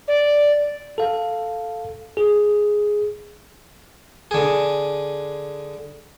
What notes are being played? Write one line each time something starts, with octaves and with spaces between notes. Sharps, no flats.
D5
A4 F5
G#4
D3 G#4